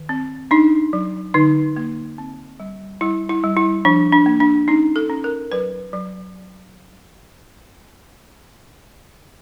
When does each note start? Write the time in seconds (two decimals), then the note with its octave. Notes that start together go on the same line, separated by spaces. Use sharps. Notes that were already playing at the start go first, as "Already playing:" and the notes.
Already playing: D#3
0.09 C4
0.51 D4 D#4
0.93 F#3
1.34 D3 D#4
1.76 A#3
2.18 C4
2.60 G3
3.01 G3 E4
3.29 E4
3.44 G3
3.57 E4
3.85 F3 D4
4.12 D4
4.26 A#3
4.40 D4
4.68 C#4 D#4
4.96 A4
5.10 C#4
5.24 A#4
5.52 F#3 B4
5.93 F#3